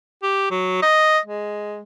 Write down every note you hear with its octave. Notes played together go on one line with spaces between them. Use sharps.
G4
F#3
D#5
G#3